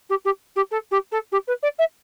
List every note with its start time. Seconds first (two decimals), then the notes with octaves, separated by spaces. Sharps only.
0.09 G4
0.25 G4
0.56 G4
0.71 A4
0.91 G4
1.11 A4
1.32 G4
1.47 B4
1.62 D5
1.78 E5